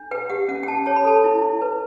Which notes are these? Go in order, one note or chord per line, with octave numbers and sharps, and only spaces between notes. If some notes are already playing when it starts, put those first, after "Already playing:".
Already playing: D4
B4 G5
G4 F#5
C#4 F#5
G5
C#4 A5
C#5 A5
B5
A4 A5
E4
E4
B4